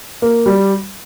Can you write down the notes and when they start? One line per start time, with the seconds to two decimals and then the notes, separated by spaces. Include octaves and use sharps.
0.22 A#3
0.46 G3